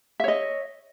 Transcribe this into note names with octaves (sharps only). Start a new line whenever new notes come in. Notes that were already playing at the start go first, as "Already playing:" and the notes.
C#5 D#5 E5